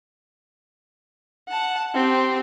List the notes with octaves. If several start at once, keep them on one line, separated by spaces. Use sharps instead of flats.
F#5 A5
C4 G4